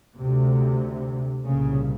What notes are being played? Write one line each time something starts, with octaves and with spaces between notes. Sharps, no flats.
D2 C3
C2 A#2 C#3